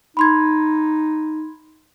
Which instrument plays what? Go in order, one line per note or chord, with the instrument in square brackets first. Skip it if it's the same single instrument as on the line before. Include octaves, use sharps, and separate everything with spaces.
[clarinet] D#4 [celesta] B5 C6 G#6